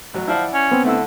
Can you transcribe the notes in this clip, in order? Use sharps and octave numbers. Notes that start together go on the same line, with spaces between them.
A1 F#3
F3 E4 D5 F#5
C#4
B3 C4
D3 A3 E4 E6